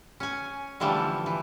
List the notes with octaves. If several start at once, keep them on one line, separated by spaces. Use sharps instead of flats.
C#4 G#5
D3 E3 F3 G3 A3
E3